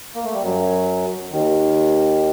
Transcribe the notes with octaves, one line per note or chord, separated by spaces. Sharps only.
A#3
A3
G3
F#2 F#3
D#2 D#3